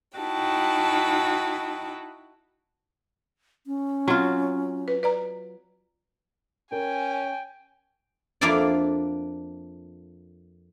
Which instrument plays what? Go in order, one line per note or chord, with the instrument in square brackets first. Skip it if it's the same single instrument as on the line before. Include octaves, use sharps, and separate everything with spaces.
[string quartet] D#4 E4 F#4 G5 A5
[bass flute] C#4
[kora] F#3 F4 [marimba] C4
[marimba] B4
B4 D5 A#5
[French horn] C#4 [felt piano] A#4 [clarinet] G5 [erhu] G#5
[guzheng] F2 A#3 D4 E4 F4 D5